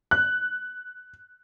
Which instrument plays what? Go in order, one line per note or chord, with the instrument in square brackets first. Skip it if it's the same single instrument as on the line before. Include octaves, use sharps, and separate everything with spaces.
[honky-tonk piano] F#6